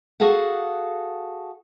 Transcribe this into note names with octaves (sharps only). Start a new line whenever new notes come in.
F#4 G#4 A4 F5 F#5